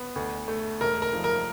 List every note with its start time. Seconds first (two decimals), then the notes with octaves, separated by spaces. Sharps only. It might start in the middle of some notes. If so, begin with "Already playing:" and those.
Already playing: B3
0.16 D2
0.48 A3
0.81 E1 A#4
1.02 A#4
1.13 F3
1.24 A#4